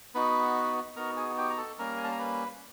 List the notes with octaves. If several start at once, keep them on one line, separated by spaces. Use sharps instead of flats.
B3 D#4 F#4 B4 B5
B3 D#4 F#4 A#4 A#5
G#4 G#5
G4 G5
A#5
A4 A5
G3 A#3 C#4 A#4 A#5
G#5
A5
A#5
B4 B5